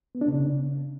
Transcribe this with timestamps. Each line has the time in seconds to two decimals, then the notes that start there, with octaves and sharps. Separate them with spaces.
0.15 B3
0.21 D4
0.28 C#3